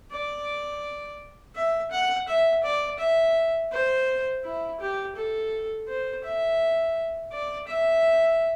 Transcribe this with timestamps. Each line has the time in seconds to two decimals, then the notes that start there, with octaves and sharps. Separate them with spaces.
0.11 D5
1.55 E5
1.92 F#5
2.28 E5
2.64 D5
2.99 E5
3.72 C5
4.44 E4
4.80 G4
5.16 A4
5.88 C5
6.24 E5
7.32 D5
7.68 E5